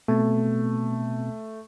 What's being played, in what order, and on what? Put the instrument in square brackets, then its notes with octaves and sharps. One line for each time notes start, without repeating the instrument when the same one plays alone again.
[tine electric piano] B2 B3 C4 [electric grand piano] A3